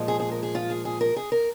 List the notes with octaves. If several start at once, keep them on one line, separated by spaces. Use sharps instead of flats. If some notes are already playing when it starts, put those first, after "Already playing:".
Already playing: A#2 F3 G#3
G#4
G#4
A#4
G#4
F4
G#4
G#4
A#4
G#4
A#4